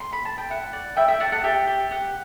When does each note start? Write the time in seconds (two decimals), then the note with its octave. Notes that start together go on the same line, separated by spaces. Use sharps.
0.00 C6
0.13 B5
0.25 A5
0.38 G5
0.50 E4 F#5
0.73 D5
0.97 E4 E5 G5
1.08 E5 G5
1.20 D5 F#5 A5
1.32 F#5 A5
1.44 G4 E5 G5
1.67 G4
1.91 G4 F#5